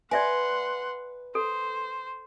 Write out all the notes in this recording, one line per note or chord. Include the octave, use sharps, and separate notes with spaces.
B4 D5 E5 F#5 G#5 C6
A4 C5